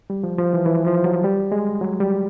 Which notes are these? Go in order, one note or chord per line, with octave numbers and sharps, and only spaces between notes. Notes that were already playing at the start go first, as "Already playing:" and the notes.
G3
F3
F3
E3
E3
F3
F#3
G3
G#3
F#3
G3